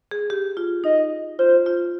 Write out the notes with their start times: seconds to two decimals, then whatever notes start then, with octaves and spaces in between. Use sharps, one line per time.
0.11 G#4
0.30 G4
0.57 F4
0.84 D#4 D#5
1.39 F4 C5
1.66 F4